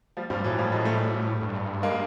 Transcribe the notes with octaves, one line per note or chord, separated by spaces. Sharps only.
F3 G3
G2 F3 G3
A2 E3 F#3
F3 G3
F#3 G#3
G3 A3
G2
G#3 A#3